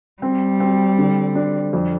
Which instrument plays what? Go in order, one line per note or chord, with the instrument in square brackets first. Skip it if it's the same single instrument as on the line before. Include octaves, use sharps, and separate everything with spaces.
[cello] G3 [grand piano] C4
[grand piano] C4
D3
D4
F2